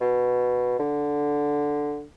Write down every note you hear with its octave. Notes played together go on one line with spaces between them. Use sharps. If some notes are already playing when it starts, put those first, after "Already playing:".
B2
D3